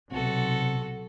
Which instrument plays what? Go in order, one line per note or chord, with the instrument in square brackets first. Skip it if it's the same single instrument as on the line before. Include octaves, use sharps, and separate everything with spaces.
[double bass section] B1 [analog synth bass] C3 [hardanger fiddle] F#4 A4